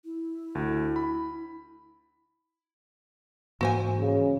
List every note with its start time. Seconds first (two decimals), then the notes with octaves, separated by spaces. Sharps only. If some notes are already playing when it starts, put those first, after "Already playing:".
0.05 E4
0.55 D2
0.96 B5
3.61 G#2 E3 A#3 F#4 C5 G#5
3.99 C#3